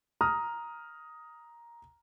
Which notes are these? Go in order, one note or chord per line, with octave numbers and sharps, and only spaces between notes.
A#5 D#6 F6